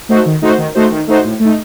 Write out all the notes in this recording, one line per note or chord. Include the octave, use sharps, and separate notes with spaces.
A3 D#4 F#4 C5
D#3
A3 D#4 F#4 C5
D#3
A3 D#4 F#4 C5
D#3
A3 D#4 F#4 C5
A2
A3 D#4